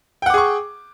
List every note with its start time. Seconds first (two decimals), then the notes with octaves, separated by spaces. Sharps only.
0.22 G5
0.26 F#5
0.30 D6
0.34 G#4
0.38 C#6